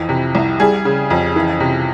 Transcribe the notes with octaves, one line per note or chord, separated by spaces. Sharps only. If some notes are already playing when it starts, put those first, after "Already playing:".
Already playing: F2 E3
C3
C2
G3 G#4
C#3
F2
E3
C3